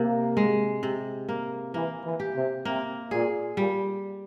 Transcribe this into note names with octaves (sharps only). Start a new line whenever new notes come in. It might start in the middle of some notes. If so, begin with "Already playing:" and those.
Already playing: C3 A#3
G#3
C3
A#3
E3 A#3
E3
G4
C3
C3 A#3
A#2 G#4
A#2 G3